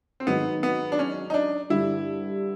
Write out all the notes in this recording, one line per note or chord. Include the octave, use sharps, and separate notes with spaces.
C4
G#2 D#3 F#3 B3
B3
D4
C#4
D#4
D4
G2 D3 G3 E4